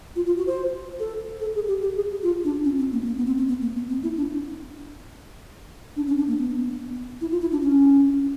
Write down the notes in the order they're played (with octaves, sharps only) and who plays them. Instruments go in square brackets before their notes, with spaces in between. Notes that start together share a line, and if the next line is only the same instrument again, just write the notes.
[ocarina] F4
F4
F#4
C5
A4
A4
G#4
G4
G4
G#4
F4
D4
C#4
C4
A#3
B3
A#3
B3
C4
C4
B3
A#3
B3
C4
E4
D4
D4
C#4
D4
A#3
B3
E4
F4
E4
D4
C#4